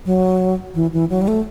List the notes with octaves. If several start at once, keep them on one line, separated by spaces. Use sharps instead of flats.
F#3
E3
E3
F#3
G3
A3